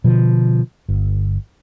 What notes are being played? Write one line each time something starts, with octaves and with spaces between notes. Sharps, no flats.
B2 D3 F3
G1